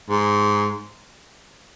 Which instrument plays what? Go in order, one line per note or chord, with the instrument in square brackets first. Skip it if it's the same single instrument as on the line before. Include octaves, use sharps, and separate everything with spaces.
[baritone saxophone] G#2